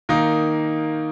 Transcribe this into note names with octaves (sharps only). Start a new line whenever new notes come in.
D#3 A#3 D#4